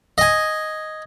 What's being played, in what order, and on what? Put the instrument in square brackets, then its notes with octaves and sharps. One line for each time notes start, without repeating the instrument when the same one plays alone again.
[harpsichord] D#5 G#5